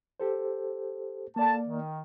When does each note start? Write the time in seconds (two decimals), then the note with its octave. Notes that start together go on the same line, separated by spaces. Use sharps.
0.20 G4 A4 C5
1.36 A#3 A4 D5 F5 A5
1.67 D#3